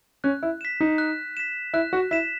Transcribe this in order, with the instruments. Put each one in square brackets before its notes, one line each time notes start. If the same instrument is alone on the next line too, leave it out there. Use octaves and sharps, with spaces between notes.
[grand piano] C#4 [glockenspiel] F#6
[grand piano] E4
[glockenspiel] B6 E7
[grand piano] D#4
[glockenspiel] F#6
B6 E7
[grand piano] E4 [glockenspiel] F#6
[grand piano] F#4
[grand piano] E4 [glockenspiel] B6 E7